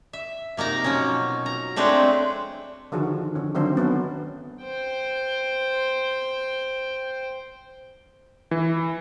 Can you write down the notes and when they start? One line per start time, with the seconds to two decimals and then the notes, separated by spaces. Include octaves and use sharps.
0.13 E5
0.57 C3 A#3 D#4 A#5
0.84 B2 F3 F#3 C#4
1.46 A#5
1.76 G#3 A3 C4 D4 B4 C#5
2.92 D3 D#3 F3 F#4 G#4
3.35 D3 C#4
3.55 D3 D#3 F#3 C4 D4 C5
3.76 F#3 B3 C#4
4.64 C5 G5
8.51 E3